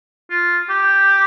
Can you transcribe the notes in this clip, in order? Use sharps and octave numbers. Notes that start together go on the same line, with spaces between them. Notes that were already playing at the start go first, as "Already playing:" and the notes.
F4
G4